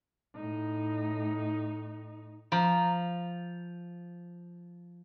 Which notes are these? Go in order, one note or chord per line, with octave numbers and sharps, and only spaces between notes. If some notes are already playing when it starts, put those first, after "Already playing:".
A2 D#4
F3 A#5